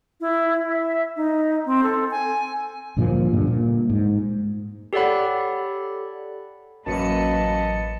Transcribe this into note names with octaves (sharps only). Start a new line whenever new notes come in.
E4
E5
D#4
C4
A4
G#5
D2 G2 A#2 F3
G2 A#2 D3
A#2
G#2
G4 A4 C#5 D5 F#5 B5
A1 F#2 F#3 A#3 B4 D#5 A5 C#7